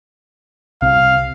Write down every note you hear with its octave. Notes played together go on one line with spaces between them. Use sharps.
C2 C3 F5